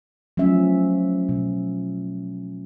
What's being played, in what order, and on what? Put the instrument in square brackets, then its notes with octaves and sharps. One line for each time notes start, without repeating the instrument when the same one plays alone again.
[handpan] F3 F#3 A3 C#4 E5
B2